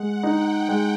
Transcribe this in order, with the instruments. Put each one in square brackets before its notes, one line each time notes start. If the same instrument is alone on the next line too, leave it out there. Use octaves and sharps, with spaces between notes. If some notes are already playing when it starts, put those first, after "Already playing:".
Already playing: [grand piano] G#3 [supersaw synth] F#5
[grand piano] D#4 [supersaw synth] G5
[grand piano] G#3